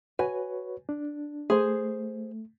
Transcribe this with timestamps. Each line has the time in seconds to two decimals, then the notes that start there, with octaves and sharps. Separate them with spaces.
0.19 F#4 B4 C#5 G#5
0.89 D4
1.50 A3 G#4 C5